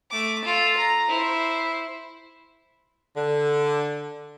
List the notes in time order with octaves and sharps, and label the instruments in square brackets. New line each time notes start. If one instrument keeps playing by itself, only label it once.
[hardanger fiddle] A3 D6
F4 A4
A#5
E4 C5
[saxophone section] D3